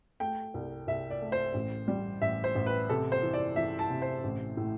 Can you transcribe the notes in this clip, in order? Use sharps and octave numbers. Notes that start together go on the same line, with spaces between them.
A3 G5
C2
C2 E5
D5
A3
C5
A1
G3
A1 E5
C5
A1
B4
C3 A4
C5
E3
D5
E3 E5
A5
C3
C5
A1
A2